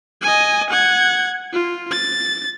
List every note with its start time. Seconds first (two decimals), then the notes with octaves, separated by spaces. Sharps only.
0.22 D#5 G#5
0.70 F#5 G#6
1.53 F4
1.91 A6